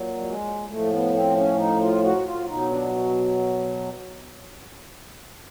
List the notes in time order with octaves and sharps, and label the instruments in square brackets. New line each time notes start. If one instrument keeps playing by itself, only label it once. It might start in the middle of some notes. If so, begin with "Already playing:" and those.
Already playing: [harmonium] A#2 F#3
G3
G#3
A2 F3 A3
B3
C4
C#4
D#4
F4
F#4
F4
B2 F#3 D#4
D4